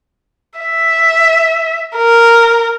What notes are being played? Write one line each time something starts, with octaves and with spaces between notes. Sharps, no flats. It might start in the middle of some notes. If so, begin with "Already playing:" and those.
E5
A#4